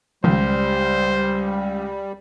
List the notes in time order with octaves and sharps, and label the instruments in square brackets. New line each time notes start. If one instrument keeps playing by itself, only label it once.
[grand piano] C#2 [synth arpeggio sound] D#3 F3 [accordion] G3 [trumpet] C5